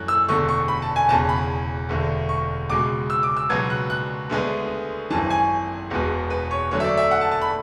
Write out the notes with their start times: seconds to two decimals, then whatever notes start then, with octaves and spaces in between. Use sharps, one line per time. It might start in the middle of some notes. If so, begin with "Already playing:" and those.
Already playing: F#2 E3 A3 F#6
0.08 E6
0.28 E1 E2 D3 A3 C#6
0.48 C#6
0.68 B5
0.82 A5
0.96 G#5
1.08 E1 E2 C#3 A5
1.29 B5
1.89 E1 D2 D3
2.29 C#6
2.69 C#2 B2 G#3 D6
3.10 E6
3.23 D6
3.37 E6
3.50 C#2 B2 F#3 B3 G#6
3.70 F#6
3.90 F#6
4.30 D2 D3 G#3 B3
5.10 G#1 F#2 E3 A5
5.30 G#5
5.90 E1 E2 B2 G#3 B3
6.30 B4
6.51 C#5
6.71 D2 D3 F#3 A3 C#5
6.80 E5
6.84 D5
6.97 E5
7.11 F#5
7.21 A5
7.31 A5
7.41 B5